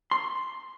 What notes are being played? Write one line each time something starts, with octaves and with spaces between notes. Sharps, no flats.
C6